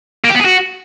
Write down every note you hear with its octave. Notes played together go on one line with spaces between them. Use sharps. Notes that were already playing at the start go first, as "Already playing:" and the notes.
A#3
G4
B3
G#4
F#4